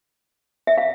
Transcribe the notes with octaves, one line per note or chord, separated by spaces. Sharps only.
E5
F5